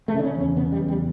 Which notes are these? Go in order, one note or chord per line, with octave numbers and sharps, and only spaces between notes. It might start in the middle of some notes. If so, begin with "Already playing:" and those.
A3
C#3
D4
C#4
E2
C#4
C#3 B3
G3
E2
G3